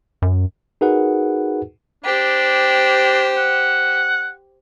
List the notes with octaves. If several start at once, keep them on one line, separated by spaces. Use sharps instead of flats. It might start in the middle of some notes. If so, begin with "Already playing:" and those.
F#2
D#4 F#4 G#4 A#4 B4 F#5
D4 G4 C5
F#5